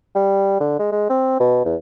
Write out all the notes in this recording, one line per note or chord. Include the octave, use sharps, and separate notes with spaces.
G3
D3
G#3
G#3
C4
B2
E2